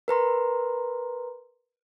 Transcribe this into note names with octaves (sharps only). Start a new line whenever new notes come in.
A#4 B4 A#5 C6